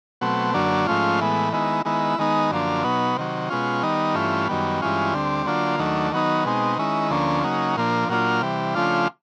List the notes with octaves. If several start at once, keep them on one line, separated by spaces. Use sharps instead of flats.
B2 F#3 A3 C4
F#2 D3 F#3 A#3 D4
G#2 F3 A3 C#4 F4
A2 E3 G#3 B3
D#3 G#3 B3 E4
D#3 G#3 B3 E4
D#3 G#3 B3 D#4
F#2 D3 F3 A#3 D4
B2 F#3 B3 D#4
C3 D#3 F#3
B2 G#3 C#4 F4
D#3 G3 B3 D#4
G2 E3 A3 C#4 F4
F#2 D#3 G3 B3
G2 E3 G#3 C#4 F4
D2 D3 G3 C4
D3 F#3 A#3 D4 F4
D#2 D#3 F#3 A3 D4
D#3 F#3 B3 D#4
B2 G#3 C4 D#4
D#3 G#3 C#4 E4
D2 D3 F3 A#3 C#4
C#3 F#3 A#3 D#4
A#2 F3 A#3 D4
A#2 F#3 A#3 D4 F4
C3 E3 G3
C#3 F3 A3 D4 F4